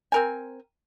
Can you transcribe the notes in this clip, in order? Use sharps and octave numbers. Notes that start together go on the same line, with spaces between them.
C4 A#4 G#5